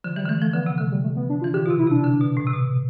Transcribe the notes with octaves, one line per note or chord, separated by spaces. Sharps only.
D3 F3
E3 G3
D3
E3 A3
F3 A3
D3 B3
C3 B3
D3 A3
G3
A3
B3
D4
F4
E3
D3 G4
B2 F4
C3
E4
C3 D4
D3
B2
A2
C3
B2